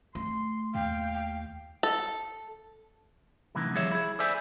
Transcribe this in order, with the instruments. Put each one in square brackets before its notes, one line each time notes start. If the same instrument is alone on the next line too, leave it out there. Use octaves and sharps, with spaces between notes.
[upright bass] A3 [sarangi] C6
[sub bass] D#2 [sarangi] F5 [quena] G5
[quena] G5
[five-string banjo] A4
[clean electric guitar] F#2 A2 C3 D#3 E3
F3 G3 G#4 C#5 E5
E4 G#4
A4 C5 D5 E5 G#5